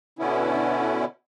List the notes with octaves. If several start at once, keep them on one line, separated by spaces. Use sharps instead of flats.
B2 D3 B3 C#4 E4